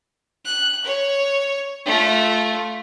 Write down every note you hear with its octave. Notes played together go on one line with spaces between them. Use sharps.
F#6
C#5
A3 F4